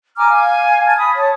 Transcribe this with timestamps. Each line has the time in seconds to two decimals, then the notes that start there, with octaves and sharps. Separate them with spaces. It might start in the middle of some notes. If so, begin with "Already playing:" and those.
0.17 G#5 A#5 D6 F6
0.30 F5 G#5
0.86 A5 F6 G#6
0.97 B5 D#6
1.16 C#5 A5